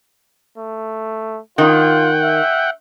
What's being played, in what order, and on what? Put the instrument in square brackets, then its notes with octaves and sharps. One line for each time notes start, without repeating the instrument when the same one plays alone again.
[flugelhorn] A3
[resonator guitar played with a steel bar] D#3 [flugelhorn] F4 [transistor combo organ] F#5 G5
[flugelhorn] E5